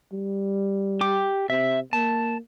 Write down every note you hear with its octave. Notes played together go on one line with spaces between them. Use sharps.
G3
G4 D6
C3 E5
A#3 A5